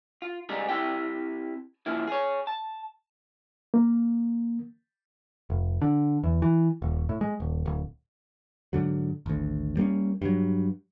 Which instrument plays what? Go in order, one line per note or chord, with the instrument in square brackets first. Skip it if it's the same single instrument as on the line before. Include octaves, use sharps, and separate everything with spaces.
[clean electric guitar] F4
G#2 C3 G3 D#4 G#4
C4 E4 G4 G5
C#3 F3 A#3 E4
G#4 C#5
A5
[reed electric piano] A#3
[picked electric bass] F1
D3
E2
E3
D#1
A2
G#3
D#1
D1
G#2 D3 F#3
G#1 D2
G3 A#3 C4 C#4
G2 F#3